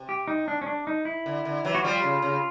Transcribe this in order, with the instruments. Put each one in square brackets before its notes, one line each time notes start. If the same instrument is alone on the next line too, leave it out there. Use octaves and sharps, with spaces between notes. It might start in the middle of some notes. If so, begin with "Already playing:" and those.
Already playing: [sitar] C3
[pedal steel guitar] G4
D#4
D4
C#4
D4
D#4
E4
[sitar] D3
D3
E3 F#3
[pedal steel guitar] F#4
[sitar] F3 G3 [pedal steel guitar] F4
[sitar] C#3
C#3